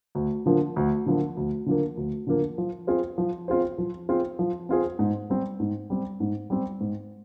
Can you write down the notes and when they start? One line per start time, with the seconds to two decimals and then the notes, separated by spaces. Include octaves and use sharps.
0.15 D2
0.46 D3 F3 A#3
0.76 D2
1.06 D3 F3 A#3
1.37 D2
1.66 D3 F3 A#3
1.97 D2
2.27 D3 F3 A#3
2.58 F3
2.87 C4 F4 G#4 C5
3.18 F3
3.48 C4 F4 G#4 C5
3.78 F3
4.09 C4 F4 G#4 C5
4.39 F3
4.69 C4 F4 G#4 C5
4.99 G#2
5.30 G3 C4
5.60 G#2
5.90 G3 C4
6.20 G#2
6.50 G3 C4
6.80 G#2